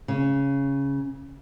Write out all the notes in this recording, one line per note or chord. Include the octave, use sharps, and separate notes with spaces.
C#3